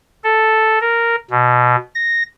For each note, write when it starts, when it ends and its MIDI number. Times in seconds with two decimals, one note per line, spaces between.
0.24 0.79 69
0.81 1.16 70
1.31 1.76 47
1.95 2.23 94